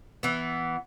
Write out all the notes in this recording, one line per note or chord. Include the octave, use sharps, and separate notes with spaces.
E3 B3